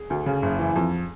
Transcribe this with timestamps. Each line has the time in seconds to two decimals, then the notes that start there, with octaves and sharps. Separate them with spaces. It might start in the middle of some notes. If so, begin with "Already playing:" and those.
Already playing: G#4
0.10 D2
0.26 C#3
0.42 F#1
0.59 E3
0.76 F2